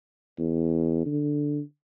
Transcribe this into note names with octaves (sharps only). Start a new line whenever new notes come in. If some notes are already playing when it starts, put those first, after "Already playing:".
E2
D3